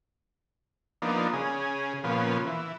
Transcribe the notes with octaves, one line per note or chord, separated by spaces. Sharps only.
F3 A#3 B3 D4 D#4
C#3 G#4
A#2 C#3 F3 B3
E3